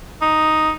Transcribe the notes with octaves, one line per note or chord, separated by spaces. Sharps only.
D#4